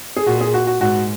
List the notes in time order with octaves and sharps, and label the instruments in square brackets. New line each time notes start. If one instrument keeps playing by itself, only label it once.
[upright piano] G#4
[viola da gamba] A#2 [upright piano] F#4
[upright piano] G#4
F#4
F#4
[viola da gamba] G#2 [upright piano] F#4